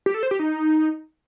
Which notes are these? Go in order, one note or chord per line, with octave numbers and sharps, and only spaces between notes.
G4
A4
C5
G4
D#4